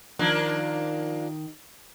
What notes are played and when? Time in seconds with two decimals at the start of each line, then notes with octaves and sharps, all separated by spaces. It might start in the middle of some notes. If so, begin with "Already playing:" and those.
0.19 D#3 F3 A#3 D4